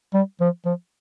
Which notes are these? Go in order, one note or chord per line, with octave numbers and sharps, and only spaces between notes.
G3
F3
F3